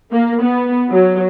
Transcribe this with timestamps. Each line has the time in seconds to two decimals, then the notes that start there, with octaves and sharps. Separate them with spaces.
0.12 A#3
0.43 B3
0.90 F#3